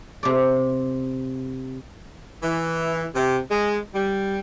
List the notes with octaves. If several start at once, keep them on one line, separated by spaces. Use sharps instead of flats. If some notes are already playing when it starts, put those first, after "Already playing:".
C3 D5
E3
C3
G#3
G3